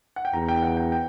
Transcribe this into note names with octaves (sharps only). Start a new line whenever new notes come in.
F#5
G5
E2 A#5
G5
F#5
G5
G5